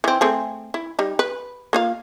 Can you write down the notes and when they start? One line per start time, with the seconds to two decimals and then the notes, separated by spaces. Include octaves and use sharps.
0.04 E3 C4
0.21 A3 C4 G#4
0.74 E4
0.99 G3 D#4
1.19 B4
1.73 A#3 F4 F5